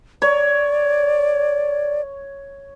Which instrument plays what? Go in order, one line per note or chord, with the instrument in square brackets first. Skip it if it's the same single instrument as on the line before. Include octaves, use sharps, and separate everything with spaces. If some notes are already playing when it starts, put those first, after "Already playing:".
[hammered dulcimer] C#5 [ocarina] D5